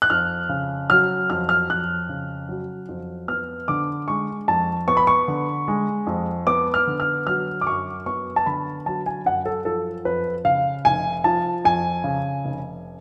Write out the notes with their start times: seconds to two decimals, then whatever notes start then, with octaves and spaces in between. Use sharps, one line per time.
0.02 F#6
0.10 F2 F6
0.49 C#3
0.90 F#3 F6
1.30 F2 F6
1.49 F6
1.69 F2 F#6
2.09 C#3
2.49 F#3
2.89 F2
3.28 B3 F6
3.68 D3 D6
4.08 G#3 C#6
4.48 F2 A5
4.88 B3 C#6
4.97 B5
5.07 C#6
5.28 D3
5.68 G#3
6.07 F2
6.47 B3 D6
6.74 F6
6.87 D3
7.00 F6
7.26 F#3 F6
7.61 D6
7.66 F#2 C#6
8.06 B3 C#6
8.36 A5
8.46 D3 B5
8.86 F#3 A5
9.06 G#5
9.25 F#2 F#5
9.45 A4
9.65 F3 A4
10.05 F2 B4
10.45 C#3 F5
10.85 F1 G#5
11.24 F3 A5
11.64 F2 G#5
12.04 C#3
12.45 F1